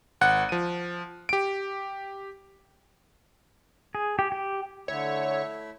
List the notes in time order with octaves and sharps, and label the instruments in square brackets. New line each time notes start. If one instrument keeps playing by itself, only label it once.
[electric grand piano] G#1 F#5 F#6
F3 D#7
G4 D7
[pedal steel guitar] G#4
G4
G4
[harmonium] D3 [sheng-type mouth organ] A3 E4 E5 [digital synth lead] C#5